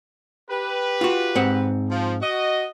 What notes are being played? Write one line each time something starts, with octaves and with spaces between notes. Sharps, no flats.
G4 B4
F4 F#4
G#2 C4 F#5
F3
F#4 D#5